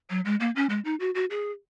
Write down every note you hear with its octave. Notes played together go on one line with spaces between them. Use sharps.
F#3
G#3
A#3
C#4
G#3
D#4
F#4
F#4
G#4